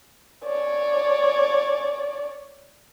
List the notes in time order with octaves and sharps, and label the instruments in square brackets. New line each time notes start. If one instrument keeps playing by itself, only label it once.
[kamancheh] C#5 D5